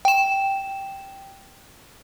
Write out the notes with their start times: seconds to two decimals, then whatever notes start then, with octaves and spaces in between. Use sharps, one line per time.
0.05 G5 E7